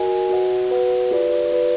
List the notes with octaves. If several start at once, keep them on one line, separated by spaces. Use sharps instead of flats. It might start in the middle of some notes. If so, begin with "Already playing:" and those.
Already playing: F#4 A#4 D#5 G#5
F#4 B4 D#5 F#5
F#4 B4 D#5 F#5
F4 G#4 B4 D5
F4 G#4 B4 D5